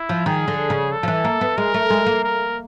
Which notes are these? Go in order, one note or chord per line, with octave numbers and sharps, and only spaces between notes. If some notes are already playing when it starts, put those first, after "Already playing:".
Already playing: E4
F3
D#3 G#4
D3
C#3
A4
F3
E3
A#3
B3
G#3 A#4
A3
G#3
A#3
A#4